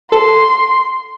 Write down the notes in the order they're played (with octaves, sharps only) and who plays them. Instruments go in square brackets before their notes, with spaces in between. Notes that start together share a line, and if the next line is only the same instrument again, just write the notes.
[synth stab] A4 [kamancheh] C6